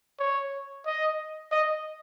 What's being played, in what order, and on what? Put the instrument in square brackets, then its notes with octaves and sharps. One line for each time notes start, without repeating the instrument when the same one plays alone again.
[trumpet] C#5
D#5
D#5